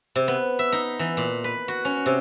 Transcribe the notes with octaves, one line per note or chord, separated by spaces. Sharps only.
C3
B3
E5
D#4
E3
A#2
B4
F#4
C#4
C3